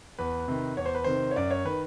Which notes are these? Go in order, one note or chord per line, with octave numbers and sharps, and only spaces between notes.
E2 B4
C3 D#3
E2 C#5
C5
B4
C3 D#3 C5
C#5
F#2 D5
C#5
D#3 B4